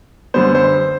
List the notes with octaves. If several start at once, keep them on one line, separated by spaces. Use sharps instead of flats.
F#2 D3 G3 B3 C5
C5